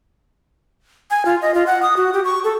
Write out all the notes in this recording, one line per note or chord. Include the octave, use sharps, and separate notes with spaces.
G#5
F4
D#5
F4
F#5
D#6
F#4
G4
C#6
A4